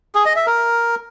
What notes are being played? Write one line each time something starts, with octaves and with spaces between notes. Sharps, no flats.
G#4
D#5
E5
A#4